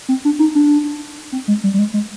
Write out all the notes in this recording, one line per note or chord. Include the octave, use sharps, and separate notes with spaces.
C4
D4
D#4
D4
C4
G#3
G3
G3
G#3
G#3